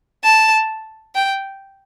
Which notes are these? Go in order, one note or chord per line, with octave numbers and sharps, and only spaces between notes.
A5
G5